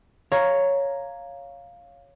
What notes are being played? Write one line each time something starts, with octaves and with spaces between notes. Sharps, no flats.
C#5 F5 A#5